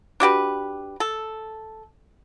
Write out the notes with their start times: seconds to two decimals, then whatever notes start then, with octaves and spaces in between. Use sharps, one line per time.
0.20 D4 F#4 G4 B4
1.00 A4